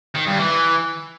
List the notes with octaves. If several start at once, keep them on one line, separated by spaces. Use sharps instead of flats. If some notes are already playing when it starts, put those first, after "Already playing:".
D#3
G2
E3